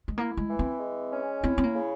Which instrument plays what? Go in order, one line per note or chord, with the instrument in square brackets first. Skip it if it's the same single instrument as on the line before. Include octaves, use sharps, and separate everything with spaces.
[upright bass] G#3
[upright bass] A#3 [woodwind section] E4
[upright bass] G#3
[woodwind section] E3
[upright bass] C4
[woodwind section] G#3
C#4
[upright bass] C4 [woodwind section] E4
[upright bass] C4
A#3
[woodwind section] C#3